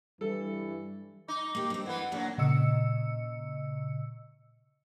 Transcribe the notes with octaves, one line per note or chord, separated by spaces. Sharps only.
G2 E3 G3 A4
D#4 D6
A#3 G4
G2 C4
E3 B3 B4 F#5
E2 B2 F#3 A#3 D4
A#2 C#3 D#5 E6 C#7